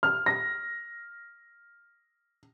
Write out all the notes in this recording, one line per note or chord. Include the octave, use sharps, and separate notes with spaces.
F6
A#6